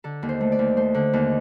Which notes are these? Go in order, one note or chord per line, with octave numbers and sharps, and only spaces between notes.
D3 A4
D#2
C5
A3
D5
D#2
A3 C5
D3
D#2